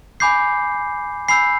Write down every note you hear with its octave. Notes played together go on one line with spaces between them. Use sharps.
G#5 B5 D6 G6 C7
G#5 B5 E6 G6 C7